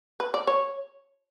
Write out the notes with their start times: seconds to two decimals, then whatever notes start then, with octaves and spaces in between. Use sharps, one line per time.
0.20 B4
0.34 D5
0.47 C#5